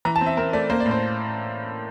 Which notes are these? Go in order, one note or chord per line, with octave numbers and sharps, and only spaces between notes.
E3 A#5
A5
C4
E5
C4 A#4
A3 D5
A#3 C5
D5
A2
C5